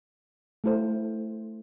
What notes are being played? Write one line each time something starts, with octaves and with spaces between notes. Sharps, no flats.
A3 E4 A4 C5